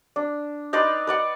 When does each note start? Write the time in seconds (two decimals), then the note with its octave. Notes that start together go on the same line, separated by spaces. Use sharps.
0.16 D4
0.73 D#4 B4 D5 C6
1.07 B4 D5 F#5